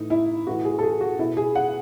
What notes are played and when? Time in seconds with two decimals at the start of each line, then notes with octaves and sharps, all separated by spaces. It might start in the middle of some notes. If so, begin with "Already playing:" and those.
Already playing: A2 E3 D#4
0.10 E4
0.47 A2 E3 F#4
0.65 G#4
0.79 A4
0.83 G#4
1.01 F#4
1.19 B2 E4
1.37 G#4
1.56 F#5